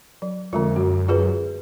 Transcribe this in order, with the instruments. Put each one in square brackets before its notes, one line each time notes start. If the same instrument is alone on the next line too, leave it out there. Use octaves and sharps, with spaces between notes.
[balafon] F#3
[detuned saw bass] F2 [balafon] D3 G#3 F4
[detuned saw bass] F#2 [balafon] F#4
[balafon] F4 G#4 B4